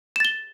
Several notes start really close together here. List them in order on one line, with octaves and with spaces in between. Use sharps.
E7 A6 G7